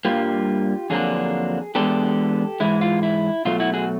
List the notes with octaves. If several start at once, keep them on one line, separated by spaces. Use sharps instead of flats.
G2 E3 G3 A#3 F4 G4
F2 D3 F#3 A#3 D4 G#4
E2 B2 G#3 B3 D4 G4 A4
G#2 E3 G#3 E4
F4
E4
B2 F#3 A3 F4
E4 F#4
F#4 G#4